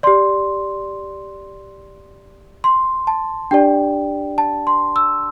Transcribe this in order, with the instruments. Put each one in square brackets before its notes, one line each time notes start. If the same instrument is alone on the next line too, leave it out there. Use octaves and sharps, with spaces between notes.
[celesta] G4 D5 C6
C6
A5
D4 G4 D5 G5
A5
C6
E6